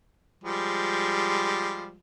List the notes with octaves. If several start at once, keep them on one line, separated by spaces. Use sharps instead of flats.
F3 G3 G#3